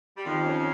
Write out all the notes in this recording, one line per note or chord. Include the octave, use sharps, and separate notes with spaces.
G3
F2 D#3 F3
C#4